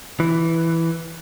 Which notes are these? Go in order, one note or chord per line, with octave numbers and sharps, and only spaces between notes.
E3